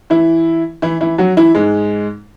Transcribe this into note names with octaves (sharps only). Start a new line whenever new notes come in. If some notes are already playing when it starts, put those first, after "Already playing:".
E3 E4
E3 E4
E3 E4
F#3 F#4
E3 E4
G#2 G#3